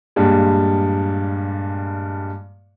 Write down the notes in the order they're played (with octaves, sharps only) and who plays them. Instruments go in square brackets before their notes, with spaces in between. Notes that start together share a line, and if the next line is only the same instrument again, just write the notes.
[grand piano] G2 A#2 G3 G#3